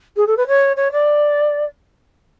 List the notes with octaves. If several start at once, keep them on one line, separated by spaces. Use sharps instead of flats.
G#4
A4
B4
C#5
C#5
D5